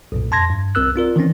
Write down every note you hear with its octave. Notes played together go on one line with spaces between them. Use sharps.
B1 F#2 A#2
F2 A5 C6 G#6 A#6
G2
C2 C4 A#4 E6 F#6
C4 F4 A#4 D5
D#3 E3 C4 C#4